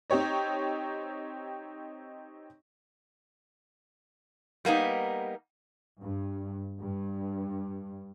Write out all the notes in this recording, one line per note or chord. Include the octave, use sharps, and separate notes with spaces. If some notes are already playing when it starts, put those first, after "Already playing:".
C4 D#4 G4 C#5 D#5
G3 A#3 B3 D#4
G2
G2